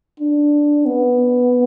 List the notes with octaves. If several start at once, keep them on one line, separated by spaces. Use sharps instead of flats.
D4
B3